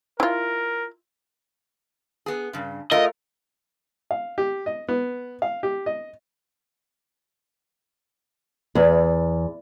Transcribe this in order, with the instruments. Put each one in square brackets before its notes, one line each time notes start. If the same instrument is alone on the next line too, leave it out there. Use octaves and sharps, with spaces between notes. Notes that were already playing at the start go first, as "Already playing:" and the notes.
[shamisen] E4 F4 [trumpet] A#4
[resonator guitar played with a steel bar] B3 G#4
G2 C#3
[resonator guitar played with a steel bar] A3 F4 A#4 [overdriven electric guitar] D#5
[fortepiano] F5
G4
D#5
B3
F5
G4
D#5
[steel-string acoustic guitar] E2